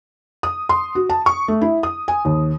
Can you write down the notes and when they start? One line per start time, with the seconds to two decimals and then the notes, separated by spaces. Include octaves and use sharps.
0.43 D#6
0.69 C6
0.95 F#4
1.10 A5
1.26 C#6
1.48 A3
1.61 E4
1.83 D#6
2.08 G#5
2.25 D#2